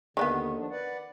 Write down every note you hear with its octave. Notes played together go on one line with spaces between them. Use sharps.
D#2 D3 D#3 A3 B3
F3 D4
B4 D5 F#5